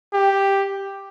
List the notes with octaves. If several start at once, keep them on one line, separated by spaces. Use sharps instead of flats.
G4